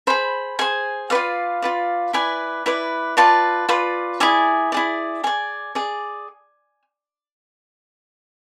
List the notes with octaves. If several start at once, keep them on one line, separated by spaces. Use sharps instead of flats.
G#4 C5 B5
G#4 C5 G#5
F4 B4 D5 F5
F4 B4 D5
E4 B4 D5 G#5
E4 B4 D5
F4 B4 D5 A5
F4 B4 D5
E4 G#4 D5 G#5
E4 G#4 D5
G#4 D5 G#5
G#4 D5